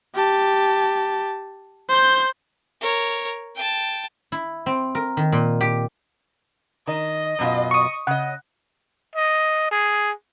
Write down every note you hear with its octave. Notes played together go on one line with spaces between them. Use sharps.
G4 A5
C5 G6
A#4 C#5
G5 A5
E4
C4
A#4
D#3
A#2
G4
D#3 D#5
F#2 B2 F4
C#6 D#6
C#3 D#5 F#5
D#5
G#4